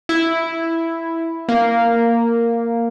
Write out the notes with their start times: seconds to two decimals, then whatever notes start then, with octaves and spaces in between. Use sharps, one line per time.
0.09 E4
1.49 A#3